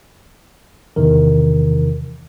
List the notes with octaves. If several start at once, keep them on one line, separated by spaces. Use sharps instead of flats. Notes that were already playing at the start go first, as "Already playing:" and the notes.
E2 C3 D#3 E3 A#4